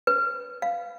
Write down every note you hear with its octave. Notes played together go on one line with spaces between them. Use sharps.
B4
F5